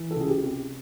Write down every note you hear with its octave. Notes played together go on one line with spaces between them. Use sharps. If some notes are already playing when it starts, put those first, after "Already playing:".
Already playing: E3
A4
C#2 G#4
G4
C3